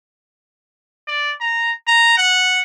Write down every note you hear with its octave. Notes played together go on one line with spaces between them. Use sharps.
D5
A#5
A#5
F#5